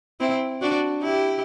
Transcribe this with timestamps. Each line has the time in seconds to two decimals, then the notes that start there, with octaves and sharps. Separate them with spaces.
0.20 C4 E4
0.61 D4 F#4
1.03 E4 G4